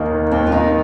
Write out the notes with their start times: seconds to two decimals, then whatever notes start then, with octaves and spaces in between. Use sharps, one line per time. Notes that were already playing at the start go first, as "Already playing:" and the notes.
Already playing: D#2 A#3 D#4
0.12 D#3
0.32 D#2 C4
0.47 F4
0.52 D#3 D#4